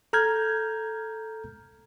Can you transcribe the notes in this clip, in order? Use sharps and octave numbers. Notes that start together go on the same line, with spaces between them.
A4 A#5 F6 G6 G#6